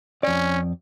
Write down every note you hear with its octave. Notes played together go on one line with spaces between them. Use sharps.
F2 C#4 D5